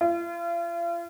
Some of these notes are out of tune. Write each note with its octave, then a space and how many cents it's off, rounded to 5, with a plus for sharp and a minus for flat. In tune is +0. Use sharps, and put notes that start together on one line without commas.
F4 -40